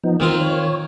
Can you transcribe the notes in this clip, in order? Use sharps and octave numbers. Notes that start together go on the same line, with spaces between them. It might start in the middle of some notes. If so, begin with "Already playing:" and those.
F3 B3 D#4
D#3 C4 F4 A#4
C#5